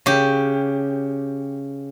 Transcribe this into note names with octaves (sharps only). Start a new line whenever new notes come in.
C#3 G4